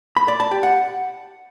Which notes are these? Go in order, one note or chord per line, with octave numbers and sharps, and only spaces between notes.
B5
D5
A5
G4
F#5